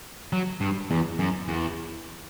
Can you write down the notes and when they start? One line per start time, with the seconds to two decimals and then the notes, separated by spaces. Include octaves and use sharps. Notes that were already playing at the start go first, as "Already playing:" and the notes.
0.33 F#3
0.61 G2
0.91 E2
1.19 F#2
1.48 E2